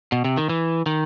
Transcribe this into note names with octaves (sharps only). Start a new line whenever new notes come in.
B2
C3
D#3
E3
D#3